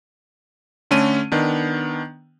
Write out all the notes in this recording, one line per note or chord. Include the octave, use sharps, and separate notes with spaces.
D3 A3 C#4 D#7
D#3 B3 D4